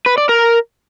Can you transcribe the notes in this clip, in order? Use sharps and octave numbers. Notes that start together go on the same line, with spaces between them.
B4
D5
A#4